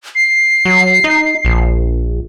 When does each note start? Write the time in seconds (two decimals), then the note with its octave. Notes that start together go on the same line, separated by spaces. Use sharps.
0.15 C7
0.65 F#3
1.04 D#4
1.45 A#1